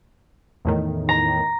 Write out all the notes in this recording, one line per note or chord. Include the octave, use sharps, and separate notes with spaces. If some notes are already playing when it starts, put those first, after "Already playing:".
E2 A2 D#3
A#5